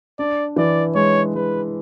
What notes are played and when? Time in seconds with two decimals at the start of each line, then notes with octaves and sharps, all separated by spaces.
0.19 D4 D5
0.56 E3 D5
0.95 G#3 C#5
1.35 G#3 B4